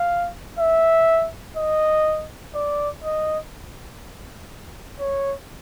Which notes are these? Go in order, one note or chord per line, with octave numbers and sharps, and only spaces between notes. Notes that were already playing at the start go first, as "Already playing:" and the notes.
Already playing: F5
E5
D#5
D5
D#5
C#5